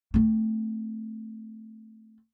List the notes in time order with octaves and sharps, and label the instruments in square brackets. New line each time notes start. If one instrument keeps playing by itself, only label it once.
[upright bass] A3 C4